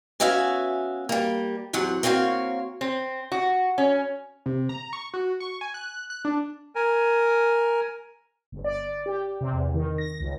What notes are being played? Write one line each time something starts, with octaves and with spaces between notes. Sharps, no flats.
B3 C#4 F#4 E5 F5 G#5
G3 A#3
E2 C3 F#3 F#5
A#3 C4 F#4 C#5 F5
C4
F#4
C#4
C3
A#5
C#6
F#4
C#6
G#5
F#6
F#6
D4
A#4 G#5
G1
D5
G4
C3
E2
D#3
A#6
C#2